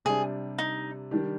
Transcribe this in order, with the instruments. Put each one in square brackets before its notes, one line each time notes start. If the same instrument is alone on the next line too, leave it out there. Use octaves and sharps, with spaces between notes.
[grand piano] C3 G3 D4 [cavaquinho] G#4
[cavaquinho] D#4
[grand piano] D#3 G3 D4 G4